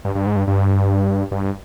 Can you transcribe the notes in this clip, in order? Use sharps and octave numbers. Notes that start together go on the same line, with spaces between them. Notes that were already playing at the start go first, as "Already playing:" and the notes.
G2
G2
G#2
G2
G2
G2